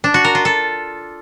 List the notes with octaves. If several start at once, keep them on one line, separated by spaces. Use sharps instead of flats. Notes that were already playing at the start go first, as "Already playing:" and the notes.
D4
F#4
A#4
F4
A4